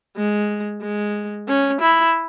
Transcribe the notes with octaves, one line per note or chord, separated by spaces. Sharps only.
G#3
G#3
C#4
E4